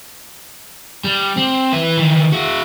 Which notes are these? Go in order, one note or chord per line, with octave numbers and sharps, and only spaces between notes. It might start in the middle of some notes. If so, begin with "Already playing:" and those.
G3
C4
E4 B4
D#3 E3
E4 F#4